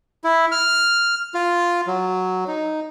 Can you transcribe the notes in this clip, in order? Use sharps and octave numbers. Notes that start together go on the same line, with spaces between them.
E4
F6
F4
F#3
D#4